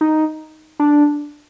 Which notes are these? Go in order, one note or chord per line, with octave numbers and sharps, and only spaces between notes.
D#4
D4